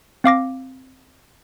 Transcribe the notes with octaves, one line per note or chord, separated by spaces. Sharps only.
C4 F5 D6 A#6